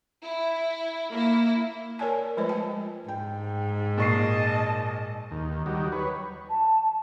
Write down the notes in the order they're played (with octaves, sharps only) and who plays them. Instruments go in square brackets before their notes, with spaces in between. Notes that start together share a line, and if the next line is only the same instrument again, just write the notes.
[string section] E4
A#3 E4
[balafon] A#4 C#5 D5 G#5 A5
F3 G#3 A3 F4 C5 D#5
G#3 G5 A5
[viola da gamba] G#2 [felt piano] G5
[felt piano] A#2 C#6 C7 [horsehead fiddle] D#5 A5
[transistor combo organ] D#2
D#3 F#3 G3
B4 C#5
[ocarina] A5